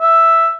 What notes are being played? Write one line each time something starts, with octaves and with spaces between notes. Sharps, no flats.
E5